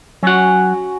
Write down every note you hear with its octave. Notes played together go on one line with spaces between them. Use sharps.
F#3 C#4 F#4 F#5